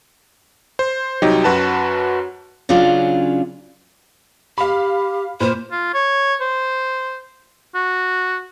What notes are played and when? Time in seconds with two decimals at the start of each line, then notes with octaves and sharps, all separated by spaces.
0.79 C5
1.22 C2 F#3 D#4 G4
1.44 F#2 F#4 B4 A5
2.69 C#3 F#3 C#4 D4 F4
4.58 G4 F5 B5
5.41 A#2 B4 C5
5.71 F4
5.94 C#5
6.41 C5
7.75 F#4